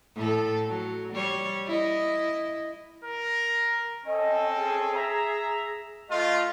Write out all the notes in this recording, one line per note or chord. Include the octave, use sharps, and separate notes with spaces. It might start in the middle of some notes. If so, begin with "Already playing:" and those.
A2 A4
F#3
G3 C#5
E4 D#5
A#4
C4 C#4 A4 D#5
G#4
E5 A#5
A3 F4 D#5